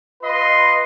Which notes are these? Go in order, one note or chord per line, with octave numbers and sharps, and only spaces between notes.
F4 B4 D#5 C6